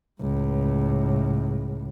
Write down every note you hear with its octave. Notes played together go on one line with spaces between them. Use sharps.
C#2 A2